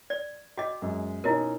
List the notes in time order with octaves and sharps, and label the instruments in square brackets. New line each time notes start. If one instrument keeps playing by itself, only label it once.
[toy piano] D5
[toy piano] F#4 D#5 [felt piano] G5 D6
[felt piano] F#2 G#3
[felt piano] B2 C#4 D#4 [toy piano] E4 F#4 A#4